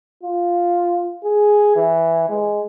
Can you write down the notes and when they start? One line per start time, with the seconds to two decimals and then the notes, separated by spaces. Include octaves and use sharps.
0.23 F4
1.23 G#4
1.76 E3
2.29 G#3